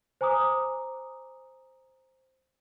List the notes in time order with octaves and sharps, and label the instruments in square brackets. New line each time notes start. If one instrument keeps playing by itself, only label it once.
[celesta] C5 G#5 A#5 D6 D#6